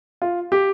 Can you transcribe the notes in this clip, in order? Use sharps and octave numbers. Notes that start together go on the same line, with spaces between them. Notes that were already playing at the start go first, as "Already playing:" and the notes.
F4
G4